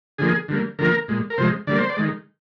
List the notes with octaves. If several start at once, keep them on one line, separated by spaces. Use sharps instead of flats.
D3 F3 A#3 G#4
D3 G3 A#3
D3 F3 A#3 A#4
A#2 G#3
A#4
C3 F3 G#3 C5
D3 G3 A#3 D5
C5
D5
D#3 G#3